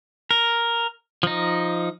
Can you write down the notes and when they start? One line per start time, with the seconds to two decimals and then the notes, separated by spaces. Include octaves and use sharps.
0.31 A#4
1.23 F3 D#4